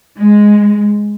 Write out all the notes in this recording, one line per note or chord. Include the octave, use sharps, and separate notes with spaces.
G#3